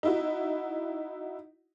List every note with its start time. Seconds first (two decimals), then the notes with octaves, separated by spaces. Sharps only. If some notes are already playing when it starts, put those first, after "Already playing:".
0.03 D#4 E4 F#4